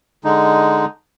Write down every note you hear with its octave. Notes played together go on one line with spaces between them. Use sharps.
D3 G#3 D#4